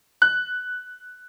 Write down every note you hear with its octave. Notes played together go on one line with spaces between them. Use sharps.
F#6